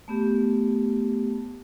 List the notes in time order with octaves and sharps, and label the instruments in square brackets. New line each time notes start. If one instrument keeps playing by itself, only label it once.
[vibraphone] A3 B3 G4